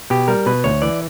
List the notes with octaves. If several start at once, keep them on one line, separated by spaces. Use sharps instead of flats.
B2 G4
G3 A#4
B2 B4
D2 C#5
E3 D5